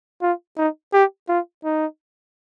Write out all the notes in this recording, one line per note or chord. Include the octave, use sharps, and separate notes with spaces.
F4
D#4
G4
F4
D#4